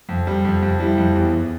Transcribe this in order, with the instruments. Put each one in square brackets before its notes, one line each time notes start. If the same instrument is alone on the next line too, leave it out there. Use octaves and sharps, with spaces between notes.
[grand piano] F2
G3
F2
F2
[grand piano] G3 [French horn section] E4
[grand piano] F2
E2
E2